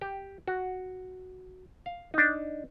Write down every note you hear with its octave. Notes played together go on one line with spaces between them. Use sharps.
G4
F#4
F5
D4 D#4